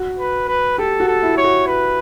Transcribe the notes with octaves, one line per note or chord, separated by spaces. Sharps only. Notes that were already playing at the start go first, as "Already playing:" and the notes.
Already playing: F#4
B4
B4
G4 A4
F#4
A4
E4
C#5
F#4
B4